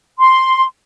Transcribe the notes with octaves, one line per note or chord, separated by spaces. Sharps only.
C6